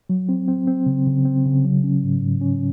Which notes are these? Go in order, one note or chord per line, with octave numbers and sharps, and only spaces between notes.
F#3
C4
C4
C4
C#3
C#3
C4
C#3
F#3
C#4
G#2
G#2
C#4